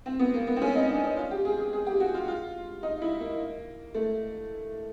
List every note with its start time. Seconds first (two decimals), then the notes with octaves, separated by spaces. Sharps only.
0.06 C4
0.19 B3
0.34 A#3
0.47 B3
0.56 C4
0.62 C#4
0.75 D#4
0.90 D4
1.04 D#4
1.17 F4
1.31 G4
1.45 G#4
1.59 G#4
1.73 G#4
1.87 G4
2.00 F#4
2.14 F4
2.28 F4
2.83 D#4
3.02 E4
3.20 A#3
3.95 A3